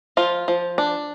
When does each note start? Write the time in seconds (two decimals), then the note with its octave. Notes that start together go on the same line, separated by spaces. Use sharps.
0.17 F3 F4
0.48 F3
0.78 D4